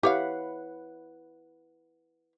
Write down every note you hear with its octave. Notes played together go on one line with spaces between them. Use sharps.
E4 G4 B4 C#5 F5 F#5